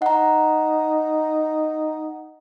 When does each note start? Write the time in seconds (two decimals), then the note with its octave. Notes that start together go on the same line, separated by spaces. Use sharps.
0.02 D#4 F#5 A#5